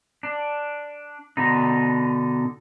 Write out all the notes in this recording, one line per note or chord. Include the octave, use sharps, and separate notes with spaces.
D4
B2 D3 D#4